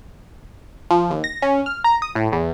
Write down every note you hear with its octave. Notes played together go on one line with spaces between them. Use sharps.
F3
D#2
A#6
C#4
F6
A#5
D#6
A2
E2